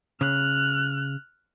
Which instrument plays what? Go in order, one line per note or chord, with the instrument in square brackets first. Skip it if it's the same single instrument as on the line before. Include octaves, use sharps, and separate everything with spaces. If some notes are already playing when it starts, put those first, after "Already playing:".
[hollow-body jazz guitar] C#3 [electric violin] F6 F#6